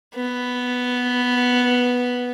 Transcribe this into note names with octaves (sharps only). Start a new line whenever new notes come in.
B3